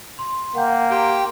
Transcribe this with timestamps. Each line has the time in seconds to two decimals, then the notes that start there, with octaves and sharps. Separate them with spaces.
0.19 C6
0.55 A#3 F#5 G5 G6
0.91 G4 G5 A#5 C6